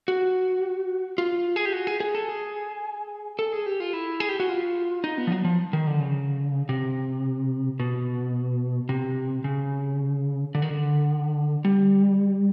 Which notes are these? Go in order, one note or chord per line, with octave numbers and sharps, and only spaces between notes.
F#4
F4
G#4
G4
F#4
G#4
G#4
A4
G#4
A4
G#4
G4
F4
E4
G#4
G4
F#4
F4
D#4
B3
F3
F#3
F3
D#3
D3
C#3
C3
B2
C3
C#3
D3
D#3
D3
G3